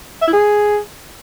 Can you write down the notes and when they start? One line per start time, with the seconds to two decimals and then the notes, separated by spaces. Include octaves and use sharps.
0.22 E5
0.27 E4
0.33 G#4